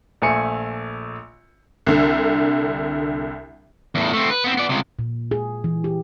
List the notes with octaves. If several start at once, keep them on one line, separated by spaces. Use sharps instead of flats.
A#1 A3 G#5 C#7
C2 D3
E2 A2
A3 C4
B4
B3 C4
B3 D5
C#2 C3
A#2
G#4
E3
G4